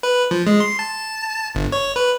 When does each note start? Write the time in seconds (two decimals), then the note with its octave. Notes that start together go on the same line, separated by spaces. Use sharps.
0.03 B4
0.31 F3
0.47 G#3
0.60 C6
0.79 A5
1.55 G1
1.72 C#5
1.96 B4